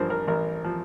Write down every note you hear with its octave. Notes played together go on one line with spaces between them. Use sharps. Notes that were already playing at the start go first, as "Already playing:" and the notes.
Already playing: A1 G2 F3 A#4 C5
A#4
A1 A#4
F3